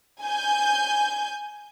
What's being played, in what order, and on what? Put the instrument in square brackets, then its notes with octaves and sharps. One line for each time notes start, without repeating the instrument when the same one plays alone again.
[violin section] G#5 G6